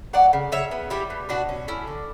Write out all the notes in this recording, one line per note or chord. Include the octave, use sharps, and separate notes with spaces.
F#3 D5 F#5
C#3
C#3 C#5 E5
B3
G3 E4 G4
B2
B2 D4 F#4
C#4
A3 C#4 E4
D3